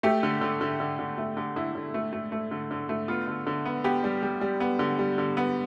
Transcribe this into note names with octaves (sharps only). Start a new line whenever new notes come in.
A3 G4
D3
D3
D3
D3
D3
A3
D3
D3 E4
D3
A3
A3
A3
D3
D3
A3
B3 F4
D3
D3
B3
B3 G4
G3
G3
G3
B3
D3
G3
D3
B3